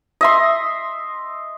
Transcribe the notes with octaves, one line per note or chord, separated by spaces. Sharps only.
D#5 E5 C6